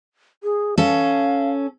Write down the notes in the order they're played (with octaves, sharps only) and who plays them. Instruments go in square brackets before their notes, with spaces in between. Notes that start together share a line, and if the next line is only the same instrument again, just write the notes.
[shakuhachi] G#4
[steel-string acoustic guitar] C#4 A4 [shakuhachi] F5